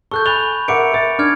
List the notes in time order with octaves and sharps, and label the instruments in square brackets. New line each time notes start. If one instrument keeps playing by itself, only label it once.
[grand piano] A4 [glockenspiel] C#6 F#6 G6
[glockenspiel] G#5 B5 F7 [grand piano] A6 G7
[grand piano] A#4 E5 F#5 [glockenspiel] D6 C#7 D7
[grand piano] A#4 A6
[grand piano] D4 [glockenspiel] D6 F6 G#6